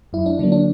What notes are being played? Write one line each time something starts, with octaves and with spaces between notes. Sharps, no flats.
F#2 E4
D4
D3 F#3 A#3 D4
D4